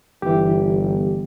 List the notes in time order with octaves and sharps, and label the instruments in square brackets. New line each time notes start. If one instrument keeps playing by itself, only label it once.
[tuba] G1 [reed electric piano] E3 G4